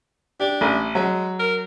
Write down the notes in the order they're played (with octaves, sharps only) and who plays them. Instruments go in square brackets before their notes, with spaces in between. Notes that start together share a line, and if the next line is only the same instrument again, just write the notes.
[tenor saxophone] D4 [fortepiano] G4
[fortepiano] A1
[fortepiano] F#3 [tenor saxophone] G#3
[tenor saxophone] A#4